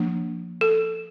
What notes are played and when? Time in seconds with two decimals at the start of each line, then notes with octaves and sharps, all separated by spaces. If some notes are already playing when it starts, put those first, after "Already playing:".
Already playing: F3 A#3 D4
0.61 A4